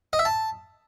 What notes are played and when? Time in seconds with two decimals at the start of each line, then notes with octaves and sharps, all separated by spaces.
0.13 D#5
0.19 E5
0.25 A5